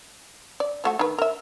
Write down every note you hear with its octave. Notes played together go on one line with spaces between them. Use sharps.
D5
F3 A3 F#4
D#3 B4
A#4 E5